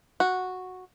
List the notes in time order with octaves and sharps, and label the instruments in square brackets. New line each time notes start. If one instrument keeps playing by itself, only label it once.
[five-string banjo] F#4